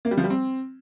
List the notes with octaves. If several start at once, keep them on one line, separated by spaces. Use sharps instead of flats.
A#3
G3
F3
G3
C4